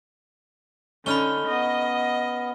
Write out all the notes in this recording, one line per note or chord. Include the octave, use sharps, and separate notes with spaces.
D3 C#4 D#4 B5 F6 G7
B3 D#5